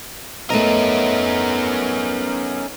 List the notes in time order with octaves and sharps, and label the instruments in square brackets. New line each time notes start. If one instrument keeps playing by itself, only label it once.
[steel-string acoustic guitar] A3 D#4 D#5 [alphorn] B3 [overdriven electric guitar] C#4 A#4